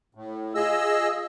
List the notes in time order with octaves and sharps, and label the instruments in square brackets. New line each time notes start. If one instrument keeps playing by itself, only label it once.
[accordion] A2
[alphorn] F4 [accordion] G#4 D#5 E6